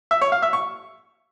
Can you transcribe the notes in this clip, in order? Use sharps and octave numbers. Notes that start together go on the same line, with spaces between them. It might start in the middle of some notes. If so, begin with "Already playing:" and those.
E5
C#5
F5
E5
C#6